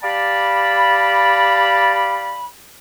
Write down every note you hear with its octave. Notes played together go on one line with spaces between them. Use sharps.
G4 D5 F5 G5 A5 B5